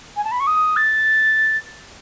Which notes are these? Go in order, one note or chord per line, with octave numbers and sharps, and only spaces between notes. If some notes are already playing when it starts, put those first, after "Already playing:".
G#5
A5
B5
C#6
D#6
A6